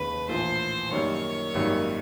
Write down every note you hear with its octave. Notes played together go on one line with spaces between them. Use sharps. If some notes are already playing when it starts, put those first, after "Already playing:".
Already playing: F1 D#2 D#3 G#3 C#4 B4
A#1 A2 E3 C5
F#2 D#3 G3 A#3 C#5
G#1 F#2 D#3 G3 A#3